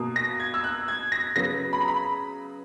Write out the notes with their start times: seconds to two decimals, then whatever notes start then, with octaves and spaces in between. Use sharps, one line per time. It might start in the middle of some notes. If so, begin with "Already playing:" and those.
Already playing: B2 A#3
0.16 A#6
0.40 G#6
0.54 E6
0.64 F#6
0.88 G#6
1.12 A#6
1.36 C#3 F#3 B3 A#6
1.73 B5
1.81 A#5
1.88 B5